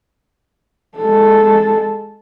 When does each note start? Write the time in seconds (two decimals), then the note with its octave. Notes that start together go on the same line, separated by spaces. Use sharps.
0.98 G#3 A4